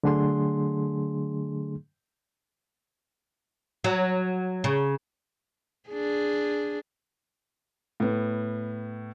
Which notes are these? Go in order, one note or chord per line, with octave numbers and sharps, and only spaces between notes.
D3 F#3 A3 D4 G#4 C6
F#3
C#3
D4 G#4
A2 B3